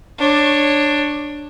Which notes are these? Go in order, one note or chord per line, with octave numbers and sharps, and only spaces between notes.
D4 C#5